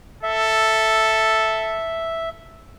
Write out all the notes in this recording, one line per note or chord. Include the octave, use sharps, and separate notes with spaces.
A4 E5